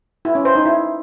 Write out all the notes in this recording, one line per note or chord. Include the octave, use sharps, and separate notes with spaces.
E4
C#4
C5
D#4
E4